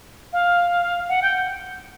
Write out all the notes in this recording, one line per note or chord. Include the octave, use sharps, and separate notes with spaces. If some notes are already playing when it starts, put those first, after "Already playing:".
F5
F#5
G5